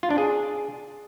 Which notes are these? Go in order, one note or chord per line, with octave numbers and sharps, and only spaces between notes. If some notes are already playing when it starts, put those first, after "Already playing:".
F4
D4
G#4